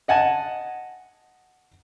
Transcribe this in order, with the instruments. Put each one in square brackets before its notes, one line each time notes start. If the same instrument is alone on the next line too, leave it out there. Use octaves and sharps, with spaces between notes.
[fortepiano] D#5 F#5 G#5 A5